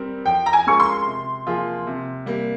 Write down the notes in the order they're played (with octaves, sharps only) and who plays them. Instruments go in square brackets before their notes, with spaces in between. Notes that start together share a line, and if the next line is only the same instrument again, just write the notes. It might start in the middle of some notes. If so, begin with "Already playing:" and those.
Already playing: [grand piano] G3 C4 G4 A#4
[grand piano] F3 [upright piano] G5
[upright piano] A#5
G#5
[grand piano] G#3 C#4 F4 A#4 [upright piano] C#6
[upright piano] C6
[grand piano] C3
F3 A#3 F4 G#4
C3
G3 A#3